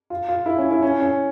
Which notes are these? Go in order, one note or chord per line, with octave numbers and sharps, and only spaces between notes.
F4
F4
E4
C#4
E4
C#4
C#4